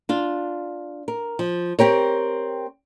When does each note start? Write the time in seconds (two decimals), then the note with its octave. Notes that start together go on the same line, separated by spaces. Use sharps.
0.09 D4 F4
1.08 A#4
1.39 F3
1.79 C4 G4 A#4 C#5